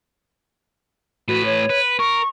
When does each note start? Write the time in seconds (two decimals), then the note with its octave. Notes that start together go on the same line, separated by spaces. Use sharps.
1.28 A2 F#4 B4
1.45 C#5
1.70 B4
1.99 A#4 C#6